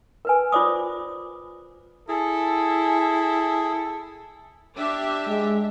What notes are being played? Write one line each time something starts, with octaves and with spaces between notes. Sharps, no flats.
A#4 B4 G#5
F4 C5 D5 D6 D#6
E4 G#4 A4 G#5
D4 G4 E5
G#3